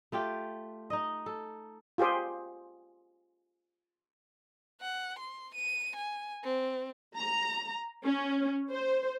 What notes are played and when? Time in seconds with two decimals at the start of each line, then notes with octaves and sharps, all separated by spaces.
0.12 A3 F4 G4 G5
0.90 D#4 D#5
1.26 A4
1.98 F4 G4 G#4 C5
4.81 F#5
5.19 C6
5.55 D#7
5.96 G#5
6.44 C4
7.16 A#5
8.06 C#4
8.71 C5